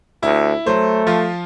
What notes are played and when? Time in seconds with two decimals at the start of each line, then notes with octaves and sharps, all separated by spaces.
0.23 D2 E4
0.66 F#3 A3 C5
1.07 F3 F4